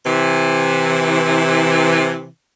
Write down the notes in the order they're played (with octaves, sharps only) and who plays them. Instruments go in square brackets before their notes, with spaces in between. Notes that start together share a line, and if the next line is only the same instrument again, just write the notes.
[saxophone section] C3 E3